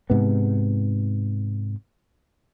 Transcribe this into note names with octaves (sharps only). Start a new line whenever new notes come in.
G#2 C3 B3